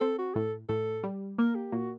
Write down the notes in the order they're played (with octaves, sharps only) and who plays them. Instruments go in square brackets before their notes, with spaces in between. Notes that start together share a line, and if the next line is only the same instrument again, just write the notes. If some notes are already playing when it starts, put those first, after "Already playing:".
[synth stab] C4 [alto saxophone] A4
[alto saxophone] F#4
[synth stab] A2 [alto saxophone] A4
[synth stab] A2 [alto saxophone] A4
[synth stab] G3
[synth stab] A#3 [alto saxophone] A#4
[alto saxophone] G4
[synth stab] A#2 [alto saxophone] F#4